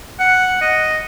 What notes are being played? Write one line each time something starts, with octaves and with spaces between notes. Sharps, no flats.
F#5
D#5